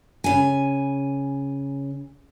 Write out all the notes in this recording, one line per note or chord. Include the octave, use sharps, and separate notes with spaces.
C#3 G#5